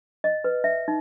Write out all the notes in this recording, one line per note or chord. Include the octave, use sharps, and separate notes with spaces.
D#5
B4
E5
D#4